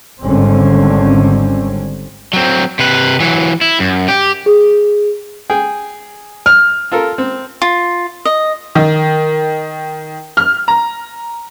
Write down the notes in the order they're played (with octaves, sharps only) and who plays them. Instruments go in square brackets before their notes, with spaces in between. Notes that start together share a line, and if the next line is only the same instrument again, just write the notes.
[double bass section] G#1 D3 G3 C4 C#4
[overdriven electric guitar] F#3 C4
C3 B4
E3 F#3
E4
F#2
G4
[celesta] G#4
[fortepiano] G#4 G5
[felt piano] F6
[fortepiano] F4 A4 A#4
C4
[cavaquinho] F4
D#5
[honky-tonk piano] D#3
F6
A#5